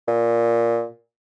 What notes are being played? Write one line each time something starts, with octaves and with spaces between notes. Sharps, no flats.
A#2